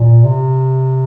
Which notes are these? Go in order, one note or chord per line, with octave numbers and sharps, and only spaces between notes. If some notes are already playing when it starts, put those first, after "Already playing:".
Already playing: A#2
C3